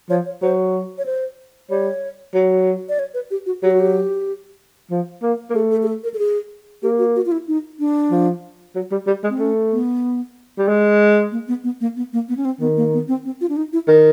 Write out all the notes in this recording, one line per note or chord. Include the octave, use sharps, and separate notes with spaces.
F3 C#5
C#5
F#3 C5
C#5
C5
G3 C#5
F#3
D5
C#5
B4
G4
F#4
F#3 G4
F#4
G4
F3
A#3
A#3
A3 G#4
A4
G#4
A4
A#4
A4
G#4
A#3 G4
F#4
F#4
F4
E4
D#4
D4
F3
F#3
G3
G3
G#3
C4
A3 C#4
B3
G3
G#3
A#3
B3
B3
A#3
B3
A#3
B3
C#4
C4
D#3 B3
A#3
B3
C4
C4
F4
D4
D#4
E4
D#3